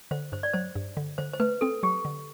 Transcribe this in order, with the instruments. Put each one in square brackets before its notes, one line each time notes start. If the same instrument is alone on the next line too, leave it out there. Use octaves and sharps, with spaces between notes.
[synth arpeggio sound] D3 [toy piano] C5
[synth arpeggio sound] G2 [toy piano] C5
[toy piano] D5
[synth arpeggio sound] F#3 [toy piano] C5
[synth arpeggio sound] G2
D3
[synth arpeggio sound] D3 [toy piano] C5
[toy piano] C5
[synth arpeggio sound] A3 [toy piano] B4
[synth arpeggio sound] C4 [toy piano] A4
[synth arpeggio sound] F#3 [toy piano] G4
[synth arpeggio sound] D3